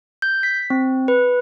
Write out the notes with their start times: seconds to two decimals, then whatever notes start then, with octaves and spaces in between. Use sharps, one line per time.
0.22 G6
0.43 B6
0.70 C4
1.08 B4